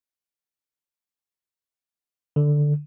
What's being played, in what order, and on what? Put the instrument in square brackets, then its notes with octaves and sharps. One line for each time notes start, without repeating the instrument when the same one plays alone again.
[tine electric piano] D3